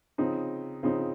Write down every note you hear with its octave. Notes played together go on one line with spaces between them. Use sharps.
C#3 F3 C4 D#4
C#3 F3 C4 D#4